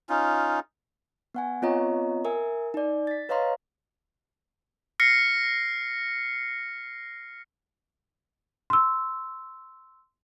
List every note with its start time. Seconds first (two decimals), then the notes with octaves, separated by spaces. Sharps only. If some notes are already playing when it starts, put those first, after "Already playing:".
0.09 C#4 D#4 F4
1.34 B3 F#5 G#5
1.62 B3 C4 F4 C#5 D#5 A#5
2.25 A#4 E5 G#5
2.74 D#4 D5
3.07 A6 B6
3.29 B4 C#5 D#5 F5 A#5 C6
5.00 F6 A#6 C7 C#7
8.70 C6 E6